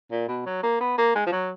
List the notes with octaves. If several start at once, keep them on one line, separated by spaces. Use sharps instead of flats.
A#2
B2
F#3
A#3
B3
A#3
G#3
F3
F#3